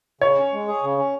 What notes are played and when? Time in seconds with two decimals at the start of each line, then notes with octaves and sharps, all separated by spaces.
0.21 C#3 C#5
0.37 C#4
0.53 G#3
0.68 G#4
0.83 C#3
0.97 C#4